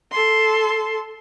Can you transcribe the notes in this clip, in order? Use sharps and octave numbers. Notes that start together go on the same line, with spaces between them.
A4 C6